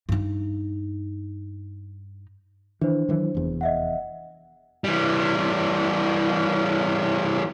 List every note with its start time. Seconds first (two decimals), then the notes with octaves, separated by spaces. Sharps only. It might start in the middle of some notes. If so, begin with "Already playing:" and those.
0.09 G2 D#4
2.81 D#3 E3 D4 C5
3.09 D#3 E3 F#3
3.35 F1 E2
3.61 D#5 E5 F#5
4.84 E3 G3